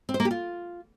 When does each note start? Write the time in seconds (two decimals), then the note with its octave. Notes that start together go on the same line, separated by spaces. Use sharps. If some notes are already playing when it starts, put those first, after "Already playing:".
0.09 C4
0.14 C5
0.20 A#3
0.25 G4
0.31 F4